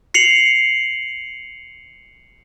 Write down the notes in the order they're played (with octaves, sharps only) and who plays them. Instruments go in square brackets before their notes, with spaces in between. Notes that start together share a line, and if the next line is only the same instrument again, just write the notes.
[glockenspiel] C7 C#7 F7 F#7